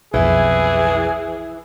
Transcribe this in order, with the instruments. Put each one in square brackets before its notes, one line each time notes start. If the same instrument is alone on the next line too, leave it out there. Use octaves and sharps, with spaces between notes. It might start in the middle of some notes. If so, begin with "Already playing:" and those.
[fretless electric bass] B1 F2 [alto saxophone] E3 [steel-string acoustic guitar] E4 E5 [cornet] G#4